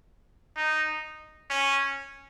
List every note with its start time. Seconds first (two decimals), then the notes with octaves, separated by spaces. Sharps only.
0.56 D#4
1.50 C#4